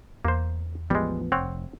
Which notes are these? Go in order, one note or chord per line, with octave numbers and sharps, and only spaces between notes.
E2 A#3 C5
A1 F3 G3 G#3 B3
F1 C4 C#5 F#5